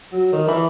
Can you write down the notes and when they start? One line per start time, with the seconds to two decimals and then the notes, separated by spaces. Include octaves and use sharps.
0.12 F#3
0.32 D#3
0.47 E3